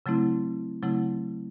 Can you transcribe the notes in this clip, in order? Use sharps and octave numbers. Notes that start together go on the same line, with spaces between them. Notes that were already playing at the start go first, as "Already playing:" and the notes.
C#3 F#3 A3 C4 E4
C#3 F#3 A3 C4 E4